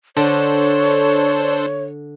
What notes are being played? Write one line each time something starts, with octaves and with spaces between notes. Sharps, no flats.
D3 D4 A4 C5 C#5